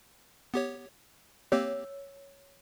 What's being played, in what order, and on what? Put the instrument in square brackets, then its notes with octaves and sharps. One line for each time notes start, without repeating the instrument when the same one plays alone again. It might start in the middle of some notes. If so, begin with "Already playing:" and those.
[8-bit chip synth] B3 G4 C#5
[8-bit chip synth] A#3 C4 G4 [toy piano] C#5 E6